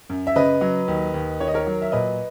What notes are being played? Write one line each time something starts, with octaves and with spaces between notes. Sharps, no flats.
F#2
E5
C#3 B4 D#5
F#3
D#2
D#2
D#3 C#5
D#5
A#4 C#5
F#3
E5
A#2 B4 D#5